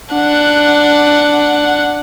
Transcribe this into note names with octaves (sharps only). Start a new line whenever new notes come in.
D4 F#5